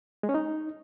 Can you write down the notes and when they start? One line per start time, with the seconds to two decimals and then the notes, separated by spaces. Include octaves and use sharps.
0.23 G#3
0.29 C#4
0.34 D#4